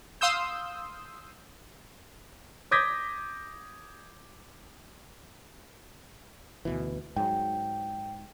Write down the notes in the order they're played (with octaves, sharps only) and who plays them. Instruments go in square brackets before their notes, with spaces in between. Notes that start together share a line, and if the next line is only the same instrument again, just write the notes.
[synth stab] F5 C6 D#6 E6 G6
[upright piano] D6 D#6 G6 G#6 A#6 B6
[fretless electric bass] D2 B2 E3
[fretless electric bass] G#2 F#3 [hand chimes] G5